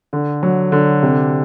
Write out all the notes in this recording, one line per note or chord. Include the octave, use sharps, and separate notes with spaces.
D3
F#3
D3
C3